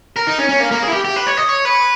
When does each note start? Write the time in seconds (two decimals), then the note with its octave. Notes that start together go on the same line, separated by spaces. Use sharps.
0.16 A#4
0.27 D#4
0.39 C#4
0.49 C#4
0.60 A#3
0.71 A#3
0.82 G#4
0.88 E4
0.93 G4
1.05 G4
1.16 B4
1.27 C#5
1.37 D#5
1.49 C#5
1.65 B4